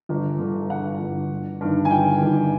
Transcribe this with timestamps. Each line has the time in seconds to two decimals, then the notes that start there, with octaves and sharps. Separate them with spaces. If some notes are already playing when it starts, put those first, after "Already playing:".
0.09 G1
0.39 G2 D3
0.69 G1 F#5
1.00 G2 D3
1.30 G1
1.61 G2 D#3
1.85 G#5
1.91 G1 G5
2.22 G2 D#3